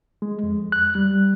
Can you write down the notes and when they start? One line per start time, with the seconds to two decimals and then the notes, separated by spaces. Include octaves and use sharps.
0.22 G#3
0.43 F2
0.72 F#6
0.95 G3